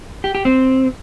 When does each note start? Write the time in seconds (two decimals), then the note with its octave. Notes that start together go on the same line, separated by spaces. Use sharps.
0.24 G4
0.35 G4
0.45 C4